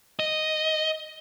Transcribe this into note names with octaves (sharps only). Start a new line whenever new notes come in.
D#5